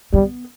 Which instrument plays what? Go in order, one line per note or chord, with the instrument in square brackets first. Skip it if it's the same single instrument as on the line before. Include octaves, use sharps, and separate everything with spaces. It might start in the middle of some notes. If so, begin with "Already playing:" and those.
[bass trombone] G3 [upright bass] B3